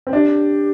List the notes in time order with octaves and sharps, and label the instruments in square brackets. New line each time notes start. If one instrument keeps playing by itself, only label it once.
[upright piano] C4
[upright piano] D4 [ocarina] G4